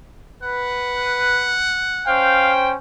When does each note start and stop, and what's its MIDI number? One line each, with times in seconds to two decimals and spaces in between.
0.43 1.58 71
0.43 2.28 78
2.08 2.74 61
2.08 2.74 72
2.08 2.53 77
2.08 2.74 79